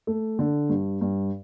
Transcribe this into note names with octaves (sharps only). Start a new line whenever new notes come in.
A3
D3
G2
G2